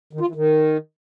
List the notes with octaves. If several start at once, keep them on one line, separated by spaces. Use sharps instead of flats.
D#3
F4
E3
D#3